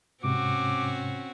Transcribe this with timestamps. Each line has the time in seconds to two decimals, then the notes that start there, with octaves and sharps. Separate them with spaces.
0.24 G#2 C3 C4 C#4 F#4 D6